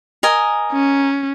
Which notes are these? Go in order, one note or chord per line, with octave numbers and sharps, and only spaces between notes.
A#4 D#5 G#5
C#4